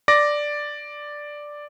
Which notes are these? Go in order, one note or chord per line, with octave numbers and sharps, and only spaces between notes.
D5 D6 A#6